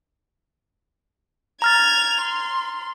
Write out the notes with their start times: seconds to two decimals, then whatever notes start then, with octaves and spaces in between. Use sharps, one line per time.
1.62 A#5 F6 G#6 A6 F7
2.21 C6